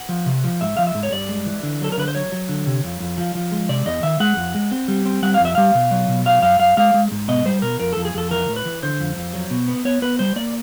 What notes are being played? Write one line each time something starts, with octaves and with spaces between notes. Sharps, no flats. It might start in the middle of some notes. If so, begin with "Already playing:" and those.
Already playing: F#5
F3
C3
F3
G#2 E5
F3 F5
E5
G#2
C#5
G2 D5
G#3
E3
D3
F#3 A4
A#4
D3 B4
C5
F#3 C#5
F#3
D3
C3
F2
F2
F3
F3
G#3
C3 D5
E2 D#5
D#3 E5
G#3 F#5
F2
G#3
C4
G3
C4
G3 F#5
F5
F2 E5
G3 F5
B2
F#3
B2
F#3 F5
F#2 F5
F#2 F5
G#3 F5
G#3
G#2
B2 D#5
G3 C5
B2 A#4
F2 A#4
F2 A4
G#4
F2 A4
E3 A#4
A2
B4
E3
D3 C5
F2
F2
F#3
B2
B3
B3 C#5
B3 B4
G3 C5
A#3 D5